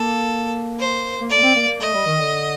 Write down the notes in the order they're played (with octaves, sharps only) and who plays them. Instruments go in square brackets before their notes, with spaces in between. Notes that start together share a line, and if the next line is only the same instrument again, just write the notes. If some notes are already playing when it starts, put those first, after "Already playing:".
Already playing: [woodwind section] A#3 [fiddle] A4
[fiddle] C5
[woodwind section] A#3
[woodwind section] A3 [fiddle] D5
[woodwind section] A#3
C4
A#3
A#3
[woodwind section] A3 [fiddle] D#5
[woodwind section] G3
D#3
D3